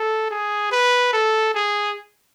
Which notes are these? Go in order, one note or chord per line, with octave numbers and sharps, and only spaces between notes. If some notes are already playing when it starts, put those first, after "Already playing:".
Already playing: A4
G#4
B4
A4
G#4